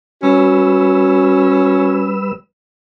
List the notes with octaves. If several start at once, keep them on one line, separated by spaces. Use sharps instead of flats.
G3 C#4 F#4 B4 E6